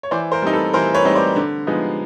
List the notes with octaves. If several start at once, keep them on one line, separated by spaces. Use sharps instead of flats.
C#5
E3 C5 D5
A#4 C5
G3 C4 D#4
A4 B4
E3 A#4 C5
B4 C#5
G3 C4 D#4
C5 D5
D3
F3 G#3 B3 D#4